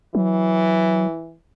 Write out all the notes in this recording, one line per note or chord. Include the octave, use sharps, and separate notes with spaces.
E3 F#3